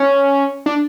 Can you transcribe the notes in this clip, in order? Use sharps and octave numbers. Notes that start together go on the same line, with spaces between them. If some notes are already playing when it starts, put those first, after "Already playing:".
Already playing: C#4
D4